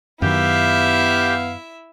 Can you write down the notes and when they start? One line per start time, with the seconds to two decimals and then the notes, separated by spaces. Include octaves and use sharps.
0.22 F#2 D#3 B3 E4 G4 E5 F5